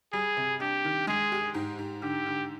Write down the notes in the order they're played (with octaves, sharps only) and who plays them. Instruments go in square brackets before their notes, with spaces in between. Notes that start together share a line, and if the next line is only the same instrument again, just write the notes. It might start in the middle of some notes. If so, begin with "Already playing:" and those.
[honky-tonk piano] G3 [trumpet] G#4
[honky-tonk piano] C3
[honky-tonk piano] D4 [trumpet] G4
[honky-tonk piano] D#3
[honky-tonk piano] G#3 [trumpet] G#4
[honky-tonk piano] G4
G#2
G#2
[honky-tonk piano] D3 [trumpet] G4
[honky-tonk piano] D3